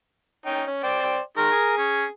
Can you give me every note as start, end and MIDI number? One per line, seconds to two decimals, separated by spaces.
0.46 0.63 61
0.46 0.63 63
0.46 0.63 79
0.67 0.79 61
0.83 1.18 72
0.83 1.18 74
0.83 1.18 79
1.37 1.50 51
1.37 1.50 56
1.37 1.74 70
1.51 2.08 68
1.51 2.08 80
1.78 2.05 61